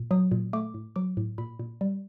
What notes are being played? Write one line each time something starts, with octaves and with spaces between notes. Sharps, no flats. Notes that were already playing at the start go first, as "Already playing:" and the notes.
Already playing: A#2
F#3 D#6
A#2
A3 D6
A2
F#3 D6
A2
A#2 B5
A#2
G3